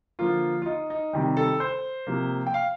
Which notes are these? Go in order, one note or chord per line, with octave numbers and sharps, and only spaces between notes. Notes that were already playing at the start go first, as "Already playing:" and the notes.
D3 F3 A#3 F4
F4
D#4
D#4
C3 D#3 G3 C4
A4
C5
C3 F3 A#3
G5
F5